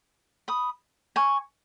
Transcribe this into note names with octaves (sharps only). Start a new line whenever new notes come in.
B5 D#6
G#5 C#6